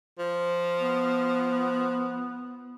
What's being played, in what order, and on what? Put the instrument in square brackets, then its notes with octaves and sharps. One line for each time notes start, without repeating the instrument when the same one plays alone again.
[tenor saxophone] F3
[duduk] B3